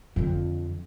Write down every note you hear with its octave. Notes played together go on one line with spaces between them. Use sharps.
F2 D3